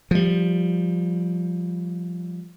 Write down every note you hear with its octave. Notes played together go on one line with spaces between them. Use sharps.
F3 G3